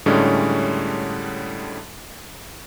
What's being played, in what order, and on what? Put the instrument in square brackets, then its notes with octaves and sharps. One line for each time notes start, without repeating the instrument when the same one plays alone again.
[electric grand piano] A2 D3 G3 G#3 C#4